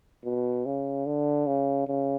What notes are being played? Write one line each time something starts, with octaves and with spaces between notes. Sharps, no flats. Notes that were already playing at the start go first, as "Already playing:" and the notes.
B2
C#3
D3
C#3
C#3